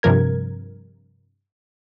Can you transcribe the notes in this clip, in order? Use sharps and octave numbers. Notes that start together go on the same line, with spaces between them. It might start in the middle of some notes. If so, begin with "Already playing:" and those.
G2 C3 F3 A#4 G#6